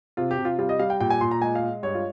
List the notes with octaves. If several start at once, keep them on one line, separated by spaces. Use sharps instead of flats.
C3 F4
G4
C3
F4
G3 F4
D#5
G3 F5
G5
A#2 G5
G#5
A#2 C6
A#5
G#3 G#5
F5
G#3
G2 C#5
F4